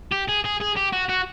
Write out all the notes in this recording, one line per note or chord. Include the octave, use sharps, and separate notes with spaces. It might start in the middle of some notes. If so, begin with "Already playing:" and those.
G4
G#4
G#4
G#4
G4
F#4
F#4